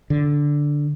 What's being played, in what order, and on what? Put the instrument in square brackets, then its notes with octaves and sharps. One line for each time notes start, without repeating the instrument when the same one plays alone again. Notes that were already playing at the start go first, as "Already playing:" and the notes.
[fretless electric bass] D3